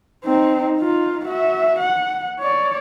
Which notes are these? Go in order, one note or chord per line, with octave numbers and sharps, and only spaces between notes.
C4 D#4
D#4 F4
F#4 E5
F#5
C#5 D5